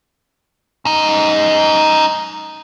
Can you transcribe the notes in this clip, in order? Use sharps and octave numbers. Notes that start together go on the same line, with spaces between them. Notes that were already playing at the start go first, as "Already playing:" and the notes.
F#2 D#4